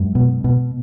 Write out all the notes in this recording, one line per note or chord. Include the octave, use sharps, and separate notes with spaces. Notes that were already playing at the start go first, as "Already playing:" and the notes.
Already playing: F#2 G#3
B2
B2